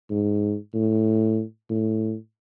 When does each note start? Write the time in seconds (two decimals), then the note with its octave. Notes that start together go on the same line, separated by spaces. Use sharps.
0.10 G#2
0.74 A2
1.70 A2